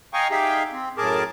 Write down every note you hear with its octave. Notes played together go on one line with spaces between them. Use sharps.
D#5 F5 G5 G#5 A#5 C#6
D#4 G4 G#4 E5 F5 G5
C4
F#2 A2 G#4 A#4 A5 D6